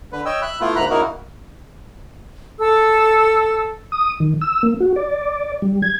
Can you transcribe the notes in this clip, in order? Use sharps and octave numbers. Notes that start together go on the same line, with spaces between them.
D3 B4
C#5 D#5 G5 E6
E5 B5 F#6
A3 B3 E4 F4
D2 G#2 A#3 A#5 B5 F#6
C#3 A#3 D#4 E4 F#4 A#4
A4 E6
D#6
D#3
E6
A#3
F#4
D5
G3
G#6